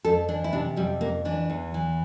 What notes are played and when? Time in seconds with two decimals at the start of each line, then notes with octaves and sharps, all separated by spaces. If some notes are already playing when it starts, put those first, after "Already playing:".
0.05 F2 A4
0.28 E3 D4
0.44 E4
0.53 C3 D4
0.77 F2 G3
1.01 F2 A#3
1.25 E3 D4
1.50 E2
1.74 E3